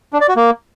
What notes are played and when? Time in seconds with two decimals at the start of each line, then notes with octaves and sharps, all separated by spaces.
0.13 D4
0.21 D5
0.28 F#4
0.36 A#3